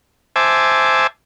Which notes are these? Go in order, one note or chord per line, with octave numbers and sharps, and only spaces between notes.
C5 E5 G#5 A5 D6